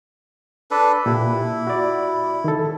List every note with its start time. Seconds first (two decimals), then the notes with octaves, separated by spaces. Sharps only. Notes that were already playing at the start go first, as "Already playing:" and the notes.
0.71 D4 A4 B4
1.06 A#2 E4 G4
1.67 F#4 D5
2.44 D#3 A4